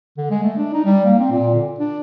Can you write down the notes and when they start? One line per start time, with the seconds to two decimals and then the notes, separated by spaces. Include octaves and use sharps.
0.17 D3
0.30 G#3
0.43 A3
0.57 D4
0.73 D#4
0.85 G3
1.04 A#3
1.19 C4
1.31 A#2
1.55 D3
1.79 D4